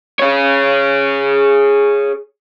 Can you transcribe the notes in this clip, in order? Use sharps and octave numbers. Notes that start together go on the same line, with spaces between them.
G#4 C#5